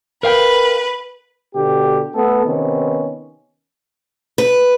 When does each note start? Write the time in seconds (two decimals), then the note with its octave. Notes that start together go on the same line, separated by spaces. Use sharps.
0.23 A#4 B4 F5 G5
1.55 B2 D3 G4
2.15 A3 B3 A4
2.46 C3 D#3 B3 C#4
4.38 B4